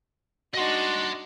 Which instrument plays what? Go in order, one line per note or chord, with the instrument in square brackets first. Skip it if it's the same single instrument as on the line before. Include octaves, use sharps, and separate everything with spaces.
[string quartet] D4 D#4 F#4 [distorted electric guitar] D#5 C6